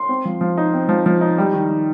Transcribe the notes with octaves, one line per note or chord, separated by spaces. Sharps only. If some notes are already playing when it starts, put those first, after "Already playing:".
Already playing: C6
C4
F3
F3
D#4
C4
F3
F3
D#4
G3
D#3
D#3